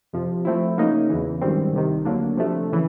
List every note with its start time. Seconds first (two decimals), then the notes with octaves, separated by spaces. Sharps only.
0.13 F2 C3 F3
0.45 F3 A3 C4 E4
0.77 C#3 F#3 A#3 D#4
1.10 E2 C#3 E3
1.41 G#1 F#2 D#3 G3 C4
1.73 C2 C3 D#3
2.05 D2 D3 F#3 A#3 D4
2.37 C3 F3 A3 D4
2.72 C#3 E3